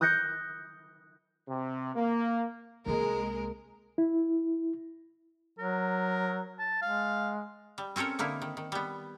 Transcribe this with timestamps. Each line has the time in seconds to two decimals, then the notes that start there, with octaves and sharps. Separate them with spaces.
0.01 D#6 F#6 G6 A#6 C#7
1.48 C3
1.96 A#3
2.86 C2 G#3 A#3 A#4
3.98 E4
5.58 F#3 A#4
6.59 A5
6.82 G#3 F5
7.78 G3
7.96 C4 C#4 A4 A#4 C#5
8.19 D3 A#3 D#4 E4
8.42 D#3
8.57 D#3
8.72 G3 B3